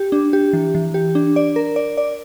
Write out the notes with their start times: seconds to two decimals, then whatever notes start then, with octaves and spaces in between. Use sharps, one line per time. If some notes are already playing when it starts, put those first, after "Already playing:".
Already playing: G4
0.12 D4
0.33 G4
0.53 E3
0.75 E3
0.94 G4
1.15 D4
1.36 D5
1.56 A#4
1.76 D5
1.97 D5